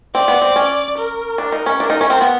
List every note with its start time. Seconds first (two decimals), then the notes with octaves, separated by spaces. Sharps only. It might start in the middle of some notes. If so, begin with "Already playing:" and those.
0.14 C4 D5
0.28 B3
0.41 C4
0.56 C#4
0.98 A#4
1.38 D4
1.52 D#4
1.66 C#4
1.79 D4 A#4
1.90 D#4
2.01 C#4
2.10 C4
2.21 B3